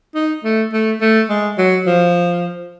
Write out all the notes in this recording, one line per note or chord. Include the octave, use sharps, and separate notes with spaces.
D#4
A3
A3
A3
G#3
F#3
F3